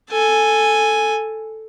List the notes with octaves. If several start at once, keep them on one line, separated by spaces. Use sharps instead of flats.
A4 G#5